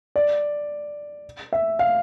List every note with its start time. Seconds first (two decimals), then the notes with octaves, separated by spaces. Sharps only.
0.16 D5
1.53 E5
1.79 F5